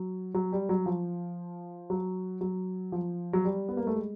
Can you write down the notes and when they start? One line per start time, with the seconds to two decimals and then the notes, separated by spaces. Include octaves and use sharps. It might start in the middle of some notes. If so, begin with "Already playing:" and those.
Already playing: F#3
0.34 F#3
0.52 G3
0.69 F#3
0.86 F3
1.90 F#3
2.41 F#3
2.92 F3
3.33 F#3
3.45 G3
3.69 B3
3.77 A#3
3.87 A3
3.96 G#3